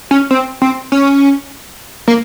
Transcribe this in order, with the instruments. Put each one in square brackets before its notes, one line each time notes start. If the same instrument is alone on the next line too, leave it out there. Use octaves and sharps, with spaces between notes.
[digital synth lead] C#4
C4
C4
C#4
A#3